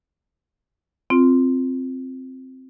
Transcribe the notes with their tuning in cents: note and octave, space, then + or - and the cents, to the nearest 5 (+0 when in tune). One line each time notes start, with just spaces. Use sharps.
C4 +0 F4 +0